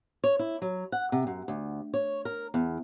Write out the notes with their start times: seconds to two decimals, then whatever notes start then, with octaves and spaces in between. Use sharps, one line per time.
0.24 C#5
0.39 E4
0.62 F#3
0.92 F#5
1.12 C3
1.27 F#2
1.48 D2
1.94 C#5
2.25 A#4
2.54 E2